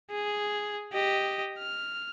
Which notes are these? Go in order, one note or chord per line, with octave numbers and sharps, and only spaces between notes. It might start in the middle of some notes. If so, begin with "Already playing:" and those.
G#4
G4 D#5
F6